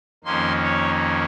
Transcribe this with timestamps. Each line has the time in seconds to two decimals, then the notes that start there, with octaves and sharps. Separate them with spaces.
0.24 F2 D#3 A#3 C#4 C6
0.64 C#5